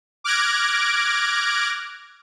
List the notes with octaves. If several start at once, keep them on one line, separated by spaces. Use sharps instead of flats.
D6 F6 F#6 G#6 A#6 D7